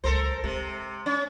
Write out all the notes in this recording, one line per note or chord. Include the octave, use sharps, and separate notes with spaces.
C#2 F#3 A4 A#4 C5
C3 G#3
C#4